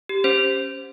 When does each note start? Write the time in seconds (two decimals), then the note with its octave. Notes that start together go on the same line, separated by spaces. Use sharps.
0.09 G4
0.24 C#4 C5